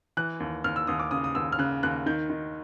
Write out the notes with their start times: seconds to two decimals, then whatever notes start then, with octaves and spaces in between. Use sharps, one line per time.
0.17 E3 F#6
0.40 D#2
0.64 D#2 F6
0.76 E6
0.87 D#2 D#6
1.00 D6
1.11 C#3 D#6
1.24 D#6
1.35 D#2 E6
1.52 F6
1.59 C#3 F#6
1.83 D#2 F#6
2.06 D#3 G6
2.30 D#3